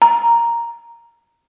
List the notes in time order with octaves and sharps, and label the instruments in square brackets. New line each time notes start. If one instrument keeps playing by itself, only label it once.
[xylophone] A#5